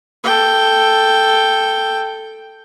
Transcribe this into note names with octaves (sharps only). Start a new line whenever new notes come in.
A4 G5